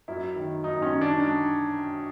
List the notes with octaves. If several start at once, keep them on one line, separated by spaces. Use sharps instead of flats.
F#2 E4
D#3
F#2 D#4
C#4
D#3
D4
D4